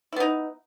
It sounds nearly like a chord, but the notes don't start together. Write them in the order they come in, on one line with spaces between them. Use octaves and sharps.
E4 B3 D#4